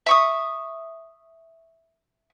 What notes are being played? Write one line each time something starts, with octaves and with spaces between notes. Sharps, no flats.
E5 C#6 D#6